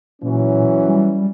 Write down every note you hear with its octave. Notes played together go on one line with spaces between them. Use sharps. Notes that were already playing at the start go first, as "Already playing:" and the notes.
A#2 E3 F#3 C#4
G3